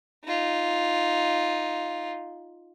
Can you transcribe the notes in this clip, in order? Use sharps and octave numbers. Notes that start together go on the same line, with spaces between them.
D#4 F4